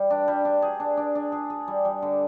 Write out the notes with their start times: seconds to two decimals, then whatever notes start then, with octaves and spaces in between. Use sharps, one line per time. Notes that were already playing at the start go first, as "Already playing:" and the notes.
Already playing: G3
0.10 D4
0.28 G3
0.45 D4
0.62 G#4
0.80 D4
0.97 D4
1.15 D4
1.32 G#4
1.50 G#4
1.68 G3
1.85 G3
2.02 D3